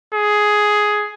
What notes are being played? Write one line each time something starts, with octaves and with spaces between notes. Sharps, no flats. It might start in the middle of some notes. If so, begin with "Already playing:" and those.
G#4